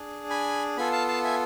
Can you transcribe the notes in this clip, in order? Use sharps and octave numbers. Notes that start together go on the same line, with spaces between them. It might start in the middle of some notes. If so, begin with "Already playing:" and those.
Already playing: D4 G#4
G#5 B5
B3 F4 A4 G#5 B5
F5 A5
F5 A5
E5 G#5